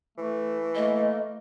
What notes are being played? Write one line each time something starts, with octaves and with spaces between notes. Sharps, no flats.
E3 A3
A3 A#3 D#5